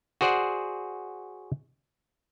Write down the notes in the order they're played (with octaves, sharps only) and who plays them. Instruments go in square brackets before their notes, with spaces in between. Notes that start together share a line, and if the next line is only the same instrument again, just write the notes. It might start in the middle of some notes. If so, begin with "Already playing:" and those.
[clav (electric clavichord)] F#4 G#4 C5 D5 F#5